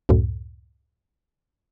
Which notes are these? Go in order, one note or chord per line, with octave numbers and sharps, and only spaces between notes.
C#2 F#2 A2